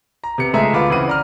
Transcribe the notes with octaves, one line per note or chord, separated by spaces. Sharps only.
A#5
C3 B3 C#7
C#2 G#3 A3 G#4 E5 A#5
D2 B3 F4 B5 D6
C#3 E3 C4 F#5 D#7
D5 A#5 F6